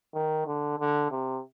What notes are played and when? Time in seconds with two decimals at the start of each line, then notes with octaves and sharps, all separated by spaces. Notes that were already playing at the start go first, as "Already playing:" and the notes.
0.14 D#3
0.47 D3
0.79 D3
1.11 C3